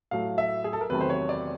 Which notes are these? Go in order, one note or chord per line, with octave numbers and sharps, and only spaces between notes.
A2 F#3 A3 F5
E5
G#4
A4
A#4
E2 C3 D#3 F#3 A3 B4
C5
C#5
D5